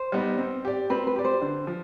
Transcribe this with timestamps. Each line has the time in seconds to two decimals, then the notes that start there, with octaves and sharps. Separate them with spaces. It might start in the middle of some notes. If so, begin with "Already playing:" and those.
Already playing: C5
0.12 G3 B3 D#4
0.38 C4
0.65 G4 D5
0.90 C4 B4
1.07 B4
1.16 G4 D5
1.25 C5
1.42 D3
1.67 F3